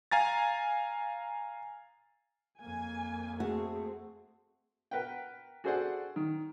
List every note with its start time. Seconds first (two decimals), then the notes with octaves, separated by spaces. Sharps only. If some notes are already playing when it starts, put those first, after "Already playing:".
0.11 F5 G#5 A#5 A6
2.61 F2 A#3 G#5
3.40 A3 C4 F#4 G#4
4.91 A#4 B4 F#5 G5
5.64 F#4 G#4 A4 C5 D5 F#5
6.16 D#3